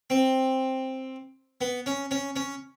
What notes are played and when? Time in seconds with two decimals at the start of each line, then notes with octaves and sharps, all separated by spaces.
0.10 C4
1.61 B3
1.86 C#4
2.11 C#4
2.36 C#4